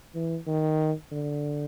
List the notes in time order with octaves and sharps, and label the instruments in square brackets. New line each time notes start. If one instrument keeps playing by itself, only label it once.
[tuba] E3
D#3
D3